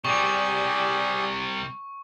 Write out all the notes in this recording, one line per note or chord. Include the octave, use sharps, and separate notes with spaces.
C3 G3 G4 G#4 D5 C#6